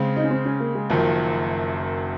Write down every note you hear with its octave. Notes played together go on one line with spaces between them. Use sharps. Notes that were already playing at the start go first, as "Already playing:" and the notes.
Already playing: C#3 G#3 C4
D#4
C#4
C4
C#4
A#3
G#3
F#1 F#2 D#3 F3